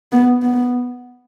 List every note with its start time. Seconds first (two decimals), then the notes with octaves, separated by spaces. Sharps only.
0.12 B3
0.43 B3